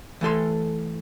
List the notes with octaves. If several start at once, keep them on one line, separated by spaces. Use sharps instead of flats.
E3 A3 A4 C6